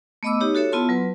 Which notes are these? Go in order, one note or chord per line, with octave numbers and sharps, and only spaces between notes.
A3 B3 D#5 B5 D6 E6
D#4 G4 C#5
F#4 A4 C#5 E5
B3 E4 F4 A5 C6
F#3 B4